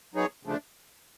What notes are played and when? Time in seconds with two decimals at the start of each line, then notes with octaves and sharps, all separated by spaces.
0.14 F#3 B3 D#4 G#4 C#5
0.43 D2 C#3 F3 A3 D4